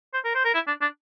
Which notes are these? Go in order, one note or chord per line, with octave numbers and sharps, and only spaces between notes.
C5
A#4
C5
A#4
E4
D4
D4